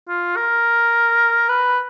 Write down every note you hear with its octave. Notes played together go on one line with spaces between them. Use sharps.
F4
A#4
B4